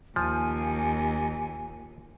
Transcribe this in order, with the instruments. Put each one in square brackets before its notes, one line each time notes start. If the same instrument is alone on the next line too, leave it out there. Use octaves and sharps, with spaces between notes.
[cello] D#2 [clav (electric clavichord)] F3 [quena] G#5